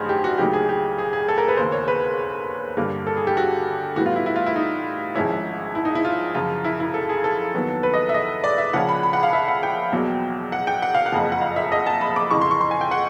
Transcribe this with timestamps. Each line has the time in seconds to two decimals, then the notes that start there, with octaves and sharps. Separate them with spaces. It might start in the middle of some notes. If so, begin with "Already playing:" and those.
Already playing: A1 G2 D#3 F#3 G#4 C5
0.09 G4
0.24 F#4
0.38 D2 C#3 F#3 A#3 D#4 G4
0.53 G#4
0.69 G4
0.98 G#4
1.13 G#4
1.28 A4
1.38 A#4
1.48 B4
1.57 E1 D#2 C#3 C5
1.72 C#5
1.88 B4
2.77 G2 D3 G3 A#3
3.07 A4
3.17 G#4
3.27 G4
3.37 F#4
3.96 A2 E3 G3 B3 F#4
4.06 F4
4.16 E4
4.26 E4
4.36 F4
4.46 E4
4.56 D#4
5.15 G#1 G#2 F3 G#3 C#4 E4
5.75 E4
5.85 D#4
5.95 E4
6.05 F4
6.35 F#2 C#3 F3 F4
6.64 E4
6.80 E4
6.94 A4
7.09 G#4
7.24 A4
7.54 D#2 D#3 F#3 B3
7.83 B4
7.94 D#5
8.09 E5
8.14 D#5
8.44 D5
8.58 E5
8.73 C#2 C#3 F3 A#3 C#4 F#5
8.89 B5
9.03 B5
9.13 F#5
9.23 F5
9.33 E5
9.48 F#5
9.63 G5
9.92 E2 B2 F#3 A#3
10.52 F#5
10.67 G5
10.82 F#5
10.95 F5
11.06 F#5
11.12 F#1 F2 C#3 F3
11.32 F#5
11.41 F5
11.56 E5
11.72 D#5
11.86 A5
12.01 B5
12.16 D6
12.31 F2 C#3 E3 C#6
12.41 C6
12.51 C#6
12.61 C6
12.71 G#5
12.81 G5
12.91 F#5